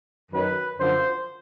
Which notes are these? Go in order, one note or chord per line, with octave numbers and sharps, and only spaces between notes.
F#2 D#3 F#3 B4
F#2 D3 F3 C5